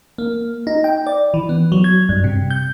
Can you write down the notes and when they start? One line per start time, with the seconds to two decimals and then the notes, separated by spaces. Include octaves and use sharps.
0.18 A#3
0.67 D#4
0.84 G5
1.07 D5
1.34 E3
1.49 B3
1.72 F#3
1.84 G#6
2.09 G2
2.24 C3
2.50 G6